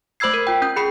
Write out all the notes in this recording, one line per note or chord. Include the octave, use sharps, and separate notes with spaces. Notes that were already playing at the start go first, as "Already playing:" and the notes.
A3 C5 B5 E6 G#6 C7
A#4
F4 G5
C#4 G6
C#4 G#4 B5 C7